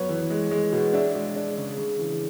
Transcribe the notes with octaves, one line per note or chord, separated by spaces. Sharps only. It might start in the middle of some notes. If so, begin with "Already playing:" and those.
Already playing: F#2 B3 B4 C#5
E3
G#3
G#3
B2
D4 E5
G#3
D4
C#3
C#3
E3